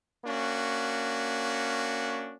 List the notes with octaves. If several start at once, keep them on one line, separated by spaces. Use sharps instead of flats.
A#3 C#4 D4 F#4